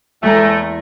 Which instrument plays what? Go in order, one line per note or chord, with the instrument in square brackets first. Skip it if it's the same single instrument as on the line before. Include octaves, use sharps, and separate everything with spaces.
[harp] E2 G#3 A#5 [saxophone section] A2 A3